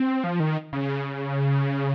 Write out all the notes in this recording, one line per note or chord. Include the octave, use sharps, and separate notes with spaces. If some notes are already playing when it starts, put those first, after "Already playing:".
Already playing: C4
F3
D#3
C#3